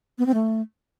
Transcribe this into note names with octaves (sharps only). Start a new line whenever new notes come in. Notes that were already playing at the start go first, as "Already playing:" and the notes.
B3
C4
A3